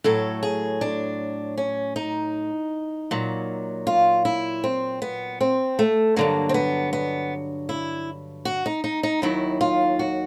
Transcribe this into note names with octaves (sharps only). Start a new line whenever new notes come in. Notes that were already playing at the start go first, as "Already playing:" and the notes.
A2 F#3 A4
G#4
D4
C#4
D#4
A#2 F#3
F4
E4
C4
B3
C4
A3
G2 D3 F#3 A#3
C4
B3
B3
E4
F#4
D#4
D#4
D#4
D#2 D#3 F#3 E4
F4
F#4